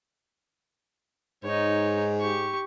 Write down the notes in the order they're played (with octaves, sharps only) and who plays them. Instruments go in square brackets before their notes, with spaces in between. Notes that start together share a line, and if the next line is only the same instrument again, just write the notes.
[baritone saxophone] G#2 [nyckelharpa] D#4 C#5
[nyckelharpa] G4 C#6